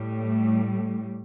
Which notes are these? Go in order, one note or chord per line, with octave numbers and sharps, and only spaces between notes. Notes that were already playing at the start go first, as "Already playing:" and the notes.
Already playing: A2 G3
A3